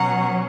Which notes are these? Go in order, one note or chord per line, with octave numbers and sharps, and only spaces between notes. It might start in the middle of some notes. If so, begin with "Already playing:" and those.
Already playing: B2 F#3 C#4 F#5 A#5